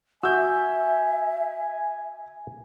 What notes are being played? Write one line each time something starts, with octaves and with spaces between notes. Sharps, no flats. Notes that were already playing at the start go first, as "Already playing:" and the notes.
F#4 E5 G#5 E6 G6